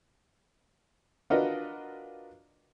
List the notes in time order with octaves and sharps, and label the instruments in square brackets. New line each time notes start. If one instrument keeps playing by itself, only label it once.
[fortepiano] D4 F4 F#4 A#4 B4 D#5